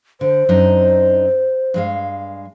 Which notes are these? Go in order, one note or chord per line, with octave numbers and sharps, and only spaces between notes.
D3 C5
F#2 D4 D#4
G2 G#3 F5